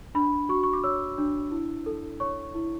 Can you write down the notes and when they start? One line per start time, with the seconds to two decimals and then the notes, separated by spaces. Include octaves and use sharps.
0.15 D4 B5
0.49 F#4 C#6
0.63 C#6
0.73 D6
0.84 C#5 E6
1.18 D4
1.51 E4
1.86 A4
2.20 C#5 C#6
2.55 E4